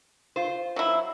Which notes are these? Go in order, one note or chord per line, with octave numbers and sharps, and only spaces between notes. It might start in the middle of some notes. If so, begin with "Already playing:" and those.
F4 C5
F#3 E4